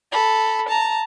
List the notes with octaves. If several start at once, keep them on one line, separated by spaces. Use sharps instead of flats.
A4 B5
A5 A#5